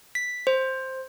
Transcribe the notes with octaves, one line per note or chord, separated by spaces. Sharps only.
B6
C5